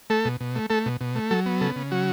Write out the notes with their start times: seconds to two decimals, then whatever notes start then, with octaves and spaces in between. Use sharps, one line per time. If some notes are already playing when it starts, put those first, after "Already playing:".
0.10 A3 A4
0.25 B2
0.41 B2
0.56 A3
0.70 A3 A4
0.86 B2
1.01 B2
1.15 A3
1.31 F#3 A4
1.46 B3
1.61 C#3 A4
1.76 C#3
1.91 F#3 F#4